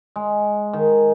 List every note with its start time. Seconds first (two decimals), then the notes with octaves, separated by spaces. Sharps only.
0.16 G#3
0.73 D#3